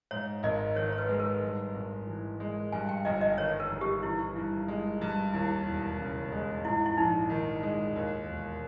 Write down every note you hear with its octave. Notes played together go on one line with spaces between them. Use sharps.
G#2 C#5
G#1 D#5
D#3 C#5
C#5
B4
G#3
A#4
G2
G#1
E3
G#3
G2 G#5
G5
G1 D#5
D#5
D#3 C#5
A#4
G1
G4
E3 E4
G2
G#3
G2
D#2 E4
E1
C#3
G#3
G#2 E4
E4
A#1 D#4
D#3
G#3
D#2
E1